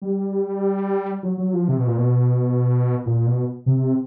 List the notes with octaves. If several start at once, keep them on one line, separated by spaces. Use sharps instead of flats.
G3
F#3
F#3
F3
C3
B2
A#2
B2
A#2
B2
C3